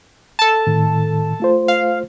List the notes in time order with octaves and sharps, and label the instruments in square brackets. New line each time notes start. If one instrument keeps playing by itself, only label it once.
[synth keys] A4 A5
[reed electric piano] A2 D#3
A3 F4 C5
[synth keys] F5